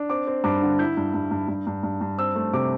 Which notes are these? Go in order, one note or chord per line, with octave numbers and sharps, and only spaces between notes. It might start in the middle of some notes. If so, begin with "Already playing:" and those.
Already playing: D4
C4 D6
C4
G2 D6
D3
E4 G6
G2
G2
G2
G2
G2
G2
G2
C4 E6
A3
C3 D6